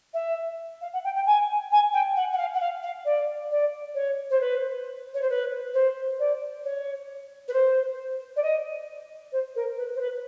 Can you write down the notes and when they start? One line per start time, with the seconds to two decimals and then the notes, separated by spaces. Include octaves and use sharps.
0.13 E5
0.81 F5
0.93 F#5
1.04 G5
1.15 G5
1.26 G#5
1.71 G#5
1.93 G5
2.16 F#5
2.32 F#5
2.37 F5
2.54 F#5
2.60 F5
2.82 F5
3.05 D5
3.51 D5
3.94 C#5
4.30 C5
4.40 B4
5.14 C#5
5.21 C5
5.29 B4
5.73 C5
6.19 D5
6.64 C#5
7.48 B4
7.53 C5
8.36 D5
8.42 D#5
9.32 C5
9.55 A#4
9.77 B4
9.95 C5
10.00 B4